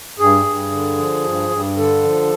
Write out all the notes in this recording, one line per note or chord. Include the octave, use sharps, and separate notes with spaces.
G2 G#4
G2
D3
F3
G2
G2
D3 A4
F3